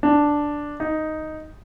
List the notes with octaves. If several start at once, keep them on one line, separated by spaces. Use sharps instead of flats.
D4
D#4